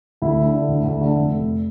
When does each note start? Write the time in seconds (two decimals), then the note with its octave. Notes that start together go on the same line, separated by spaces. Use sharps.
0.22 D2 E4
0.38 D3
0.54 D3
0.68 D2
0.84 D2
1.01 D3
1.16 F1
1.31 F1